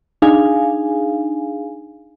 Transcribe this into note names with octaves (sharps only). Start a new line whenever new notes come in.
D4 D#4 G#4 F5 G#5